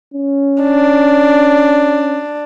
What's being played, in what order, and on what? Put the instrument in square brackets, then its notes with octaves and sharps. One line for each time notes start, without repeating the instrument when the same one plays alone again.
[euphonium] C#4
[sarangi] D4